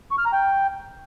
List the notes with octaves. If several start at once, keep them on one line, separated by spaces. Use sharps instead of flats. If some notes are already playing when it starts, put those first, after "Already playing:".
C#6
F6
A#5
G5